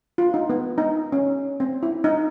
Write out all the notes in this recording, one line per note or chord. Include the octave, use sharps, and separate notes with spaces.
F4
D#4
B3
D#4
C#4
C4
E4
D#4